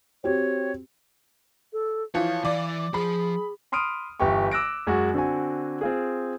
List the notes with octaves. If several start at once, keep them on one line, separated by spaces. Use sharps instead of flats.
C4 F#4 G4 C#5
A4
E3 F3 C#5 F5
E3 D5
F3 G#4 C5 B5
B5 C6 D#6 F6 D7 D#7
G1 E3 G4 G5 C#6
D6 E6 F#6 A#6 D7
F#2 G#3 F#4
D3 C4 F#4 G#5
C4 F4 G#4